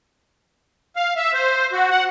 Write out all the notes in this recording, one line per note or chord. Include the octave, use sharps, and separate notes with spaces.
F5
E5
C5
F#4
F#5